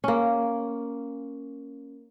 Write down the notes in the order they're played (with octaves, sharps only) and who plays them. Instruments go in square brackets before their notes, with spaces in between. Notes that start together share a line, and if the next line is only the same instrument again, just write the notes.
[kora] A#3 C#4